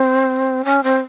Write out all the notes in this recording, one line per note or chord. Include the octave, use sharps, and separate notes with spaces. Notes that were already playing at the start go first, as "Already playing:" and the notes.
Already playing: C4
C#4
C4